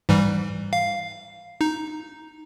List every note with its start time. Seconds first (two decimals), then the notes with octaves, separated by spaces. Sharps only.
0.09 G#2 E3 G3
0.73 F5
1.61 D#4